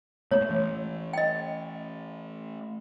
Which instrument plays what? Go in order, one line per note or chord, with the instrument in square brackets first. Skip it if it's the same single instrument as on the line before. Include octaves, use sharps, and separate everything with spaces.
[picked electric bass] G#3 A3 B3 [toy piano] C#5
[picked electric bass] E3 A3
[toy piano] D#5 G5